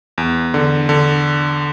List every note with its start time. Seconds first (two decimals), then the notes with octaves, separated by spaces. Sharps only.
0.18 E2
0.54 D3
0.89 D3